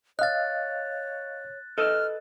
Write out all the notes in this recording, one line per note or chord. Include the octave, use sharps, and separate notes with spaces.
C#5 D#5 F5 F#6 A6
A4 B4 D#5 F6